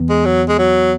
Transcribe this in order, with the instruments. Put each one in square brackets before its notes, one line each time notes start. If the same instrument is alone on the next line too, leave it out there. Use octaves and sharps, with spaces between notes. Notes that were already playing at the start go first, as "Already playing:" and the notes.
Already playing: [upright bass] E2
[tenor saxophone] G#3
F#3
G#3
F#3